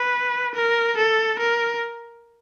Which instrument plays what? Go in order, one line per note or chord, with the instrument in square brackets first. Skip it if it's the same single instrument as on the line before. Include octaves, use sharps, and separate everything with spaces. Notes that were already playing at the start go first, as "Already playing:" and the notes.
Already playing: [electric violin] B4
A#4
A4
A#4